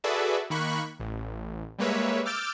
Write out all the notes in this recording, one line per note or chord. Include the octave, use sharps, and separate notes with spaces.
F#4 G#4 A4 B4 D5 E5
D#3 A#3 B5 C#6 F#6
A1
G3 G#3 A#3 B4 C#5 E5
D6 E6 F6 G6 A6 D7